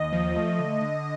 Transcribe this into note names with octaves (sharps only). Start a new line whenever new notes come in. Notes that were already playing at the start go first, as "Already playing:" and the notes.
Already playing: D#2 D#5
F3
A3
D3
D3